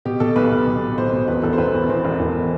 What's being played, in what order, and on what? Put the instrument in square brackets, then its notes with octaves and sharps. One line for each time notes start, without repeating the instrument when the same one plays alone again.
[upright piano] B2 G4
B2 A4
B1 B4
B1
B2
B2
B2 C5
B2
E1 B4
E1 A4
C5
E1 B4
E2
E2 C5
E1
E1